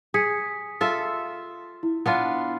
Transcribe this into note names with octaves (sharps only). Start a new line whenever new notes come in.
G#4 D#6 B6 C#7
F4 A4 E5
E4
B3 D4 F4